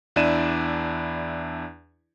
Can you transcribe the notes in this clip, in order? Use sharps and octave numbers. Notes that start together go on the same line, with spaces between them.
E2 D4 E4 D5 D#7 E7